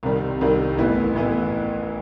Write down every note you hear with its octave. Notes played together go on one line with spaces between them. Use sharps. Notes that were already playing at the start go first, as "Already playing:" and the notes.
C2 C3 D#3 G3
C2 C3 D#3 G3
A1 A2 E3 B3 E4
A1 A2 E3 B3 E4